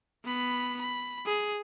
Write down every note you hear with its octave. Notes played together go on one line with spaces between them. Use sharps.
B3 B5
B5
G#4